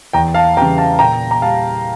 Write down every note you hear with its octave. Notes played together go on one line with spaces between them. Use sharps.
E2 G5 A#5
F5 A5
C#3 E3 G3 G5 A#5
F5 A5
A#2 G5 A#5
A#5
G3 F5 A5